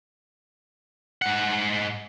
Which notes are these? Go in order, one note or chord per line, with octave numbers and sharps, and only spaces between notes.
G#2 F#5